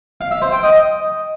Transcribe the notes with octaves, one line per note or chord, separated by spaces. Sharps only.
F5
E5
C5
G5
D#5